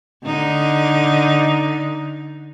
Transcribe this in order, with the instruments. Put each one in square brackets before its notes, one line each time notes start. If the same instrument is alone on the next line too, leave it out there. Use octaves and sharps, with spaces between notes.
[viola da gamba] D3 D#4